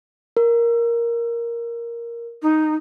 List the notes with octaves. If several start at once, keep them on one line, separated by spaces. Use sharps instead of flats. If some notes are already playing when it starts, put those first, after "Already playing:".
A#4
D#4